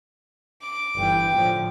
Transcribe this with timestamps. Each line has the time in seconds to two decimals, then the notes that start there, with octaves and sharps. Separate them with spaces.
0.62 D6
0.97 G1 E3 G5
1.33 A2 D3 F3